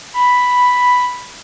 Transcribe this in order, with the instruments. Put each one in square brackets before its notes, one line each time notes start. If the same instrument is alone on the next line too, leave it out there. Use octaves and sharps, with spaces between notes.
[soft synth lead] B5